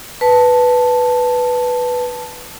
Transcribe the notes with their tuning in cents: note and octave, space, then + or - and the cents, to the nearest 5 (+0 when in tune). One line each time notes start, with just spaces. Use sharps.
B4 +0 A5 +0